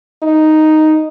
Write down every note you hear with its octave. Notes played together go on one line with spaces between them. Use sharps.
D#4